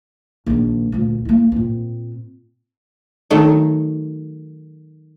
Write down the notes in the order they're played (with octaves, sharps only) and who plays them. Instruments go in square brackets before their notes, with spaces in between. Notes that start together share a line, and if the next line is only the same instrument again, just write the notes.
[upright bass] A#1 D#3
D2 A#2
A#3 E4
A#2 C4
[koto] D#3 F#3 A3 D#4